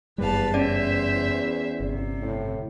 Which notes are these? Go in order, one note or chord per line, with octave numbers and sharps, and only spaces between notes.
F#1 E2 G2 G3 B4 F5 A5
C#4 C5 D5 E5
G1 C3
A2